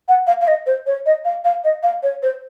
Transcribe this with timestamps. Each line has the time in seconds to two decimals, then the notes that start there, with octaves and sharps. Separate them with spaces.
0.08 F#5
0.27 F5
0.41 F5
0.48 D#5
0.66 C5
0.86 C#5
1.06 D#5
1.25 F5
1.45 F5
1.64 D#5
1.83 F5
2.03 C#5
2.23 C5